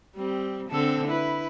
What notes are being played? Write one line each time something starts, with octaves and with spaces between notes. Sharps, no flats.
G3 C4
D3 C4 A4
E4 B4